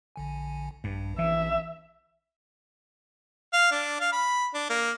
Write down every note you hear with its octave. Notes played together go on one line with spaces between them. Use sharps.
A#1 D3 G#5
A#1 G2
E3 E5
F5
D4
F5
B5
D4
A#3